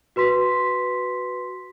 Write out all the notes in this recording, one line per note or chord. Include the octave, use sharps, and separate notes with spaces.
F#4 B4 C6 B6